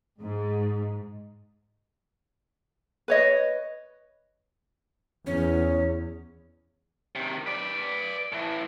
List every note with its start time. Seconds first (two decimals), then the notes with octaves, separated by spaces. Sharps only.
0.21 G#2
3.08 B4 C#5 D#5
5.26 E2 C#4
7.15 C3 D#3
7.46 B4 D5
8.32 A2 E3